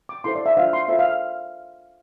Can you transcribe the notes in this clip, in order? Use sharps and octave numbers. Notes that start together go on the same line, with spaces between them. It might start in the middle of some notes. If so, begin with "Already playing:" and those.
D6
E4 A4 C5 C6
D5
E5
D4 F4 C5 F5
C6
F4 A4 C5 E5
F5